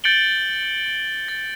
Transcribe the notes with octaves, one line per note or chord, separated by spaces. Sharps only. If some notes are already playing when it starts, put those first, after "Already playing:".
G6 A6 C#7 D7 F#7 G7
A6